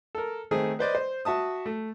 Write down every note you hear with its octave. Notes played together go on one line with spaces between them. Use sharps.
A4 A#4
D#3 A3 C4 G#4
B4 C5 D5 D#5
C5
F#4 E5 A5 D#6
A3